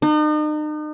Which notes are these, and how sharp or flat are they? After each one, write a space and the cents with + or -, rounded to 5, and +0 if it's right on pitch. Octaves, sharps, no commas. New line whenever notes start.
D#4 -40